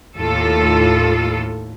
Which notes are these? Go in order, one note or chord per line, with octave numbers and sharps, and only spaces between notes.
D#2 A2 F4 A4